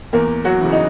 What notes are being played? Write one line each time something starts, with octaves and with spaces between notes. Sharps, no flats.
E2 A#3 A#4
F#3 F#4
C#3 E3
D#4